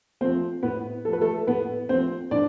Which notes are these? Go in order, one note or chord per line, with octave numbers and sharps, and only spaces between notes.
F3 A3 C4 C5
A2 B3 B4
F3 A3 A4
B4
A3 A4
A2 B3 B4
F3 A3 C4 C5
A2 D4 D5